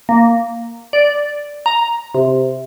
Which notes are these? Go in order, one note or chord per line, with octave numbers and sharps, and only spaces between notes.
A#3
D5
A#5
C3